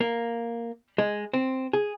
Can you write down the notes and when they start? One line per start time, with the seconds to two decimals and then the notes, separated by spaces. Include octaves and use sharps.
0.01 A#3
0.98 G#3
1.33 C4
1.73 G#4